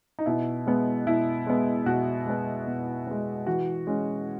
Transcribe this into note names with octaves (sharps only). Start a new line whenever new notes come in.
D#4
B2 E4
G#3 B3
B2 E4
G#3 B3
B2 F#4
G#3 B3
B2
G#3 B3
E3 F#4
G#3 C#4